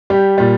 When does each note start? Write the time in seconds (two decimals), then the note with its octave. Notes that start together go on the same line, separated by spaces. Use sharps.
0.10 G3 G4
0.38 A#2 G3